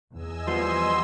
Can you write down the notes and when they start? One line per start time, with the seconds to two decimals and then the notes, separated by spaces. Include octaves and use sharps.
0.14 E2 D#5 G#5 E6
0.47 F3 G3 B3 C6